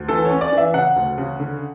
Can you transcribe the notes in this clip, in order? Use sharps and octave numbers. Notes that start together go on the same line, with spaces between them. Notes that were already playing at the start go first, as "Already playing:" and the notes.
Already playing: D2
E3 A4
C#5
C#4
D5
E3
E5
C#3 F#5
D2
C#3
D3